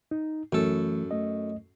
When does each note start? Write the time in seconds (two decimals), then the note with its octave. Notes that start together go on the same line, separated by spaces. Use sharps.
0.11 D#4
0.53 F#2 E3 A3 A4
1.11 A3 D#5